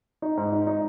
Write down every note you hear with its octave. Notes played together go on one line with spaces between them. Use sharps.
D#4
G#2
D#4
D#4